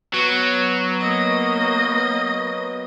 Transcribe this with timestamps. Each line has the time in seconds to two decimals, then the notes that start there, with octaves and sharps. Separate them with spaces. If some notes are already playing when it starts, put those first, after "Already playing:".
0.14 F#3 B3
1.00 A#3 D#5